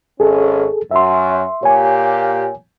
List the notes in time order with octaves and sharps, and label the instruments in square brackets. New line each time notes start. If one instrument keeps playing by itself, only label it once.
[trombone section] G#1 C#4 [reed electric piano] G#4 A4
[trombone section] F#2 [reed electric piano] E5 C6
[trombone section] A#2 A#3 G4 [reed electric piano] C#5 G#5